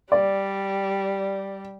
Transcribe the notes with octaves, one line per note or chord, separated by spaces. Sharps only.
G3 D5